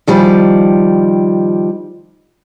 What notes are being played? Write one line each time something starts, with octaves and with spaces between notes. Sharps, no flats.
D#3 F3 G3